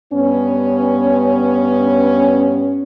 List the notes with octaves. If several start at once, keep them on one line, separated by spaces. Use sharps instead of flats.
G2 B3 C#4